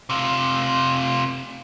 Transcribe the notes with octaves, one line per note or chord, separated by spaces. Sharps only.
C3 F4